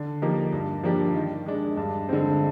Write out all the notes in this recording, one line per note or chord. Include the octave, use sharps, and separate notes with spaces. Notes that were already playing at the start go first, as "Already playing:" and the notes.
Already playing: D3
F3 A#3 D#4 G4
G2
F3 A#3 D4 G4
D#3
G#3 D4
G2
D3 G#3 C4